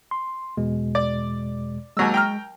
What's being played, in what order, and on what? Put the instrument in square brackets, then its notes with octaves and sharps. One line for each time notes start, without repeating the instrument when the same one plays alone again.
[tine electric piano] C6
E2 B2 G#3
[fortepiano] D5
[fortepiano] D#2 F#3 E6 [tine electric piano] G#3
[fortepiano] G5 A#5 F6